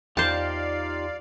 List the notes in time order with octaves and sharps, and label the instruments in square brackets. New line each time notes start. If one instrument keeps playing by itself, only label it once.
[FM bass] E2 [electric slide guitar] D#4 F4 G4 [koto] C5 A5 [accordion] D5 F5